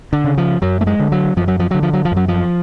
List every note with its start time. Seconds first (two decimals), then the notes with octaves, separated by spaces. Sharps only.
0.13 D3
0.24 C#3
0.38 F3
0.62 F#2 F#3
0.81 A3
0.87 G#3
0.99 D3
1.12 F#3
1.37 F#2 F3
1.48 F#3
1.60 F3
1.71 D3 F#3
1.83 F3
1.93 F#3
2.05 F3
2.12 F#2 F#3
2.28 F3